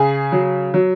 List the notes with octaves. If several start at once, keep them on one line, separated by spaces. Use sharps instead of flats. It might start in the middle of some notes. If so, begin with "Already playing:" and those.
Already playing: C#3 G#4
F#3
F#3